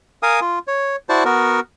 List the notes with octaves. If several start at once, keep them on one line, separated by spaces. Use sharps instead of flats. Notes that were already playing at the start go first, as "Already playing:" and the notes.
A#4 F5 G#5 D#6
F4
C#5
E4 F#4 C5 D5 A5
B3 F#4 A#4